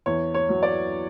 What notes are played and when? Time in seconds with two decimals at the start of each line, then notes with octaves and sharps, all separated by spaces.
0.06 E2 C#5
0.34 C#5
0.49 F#3
0.63 D5